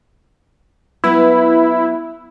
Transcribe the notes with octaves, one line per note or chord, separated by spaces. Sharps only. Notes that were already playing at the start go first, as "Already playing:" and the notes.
F#3 B3 E4 B4